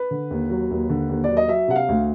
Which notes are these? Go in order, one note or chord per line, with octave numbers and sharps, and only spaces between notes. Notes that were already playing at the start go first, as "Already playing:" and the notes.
Already playing: B4
D3
D#2
F#3
D#2
D3
D#2
F#3 D5
D#5
F#3 E5
C3 F#5
F5
D2